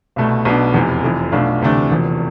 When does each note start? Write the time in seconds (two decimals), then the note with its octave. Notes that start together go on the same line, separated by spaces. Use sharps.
0.16 C2 B2 A3
0.45 B1 B2 B3 D4
0.74 F1 E2 C3 E3
1.04 F1 F2 E3
1.32 B1 B2 A3 D4 F4
1.62 D2 C3 E3 A3 D4
1.90 E1 E2 C3 F3